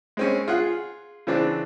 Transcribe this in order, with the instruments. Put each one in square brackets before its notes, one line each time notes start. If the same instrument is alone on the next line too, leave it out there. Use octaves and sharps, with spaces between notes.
[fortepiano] G#3 C4 C#4
F4 G#4 F#5
C#3 E3 C4 D4